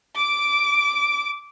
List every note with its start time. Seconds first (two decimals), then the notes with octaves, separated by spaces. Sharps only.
0.16 D6 D7